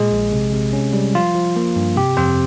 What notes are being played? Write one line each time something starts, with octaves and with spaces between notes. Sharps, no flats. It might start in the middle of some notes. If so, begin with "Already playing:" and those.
Already playing: A#2 G#3 G#4
A#1
C3
C3
C#4
G3
F3 F4
F3
A#3
G2
C3 G4
F2 C4 C5